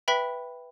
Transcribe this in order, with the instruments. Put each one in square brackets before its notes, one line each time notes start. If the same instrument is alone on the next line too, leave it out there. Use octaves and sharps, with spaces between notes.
[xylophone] B4 E5 G5 B5 B6